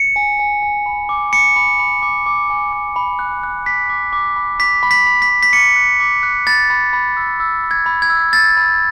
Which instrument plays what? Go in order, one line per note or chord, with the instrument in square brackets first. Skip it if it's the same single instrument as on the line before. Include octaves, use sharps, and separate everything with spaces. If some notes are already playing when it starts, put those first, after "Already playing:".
Already playing: [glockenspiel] C#7
G#5
G#5
G#5
B5
D6
B5 C#7
B5
B5
D6
D6
G#5
D6
B5
F#6
F#6
D6 B6
D6
D6
B5
D6 B6
B5
B6
B5
B6
B5
B6
D6 C#7
F#6
D6
F#6
B5 A6
B5
B5
E6
E6
B5
G#6
B5
G#6
E6
E6 A6
B5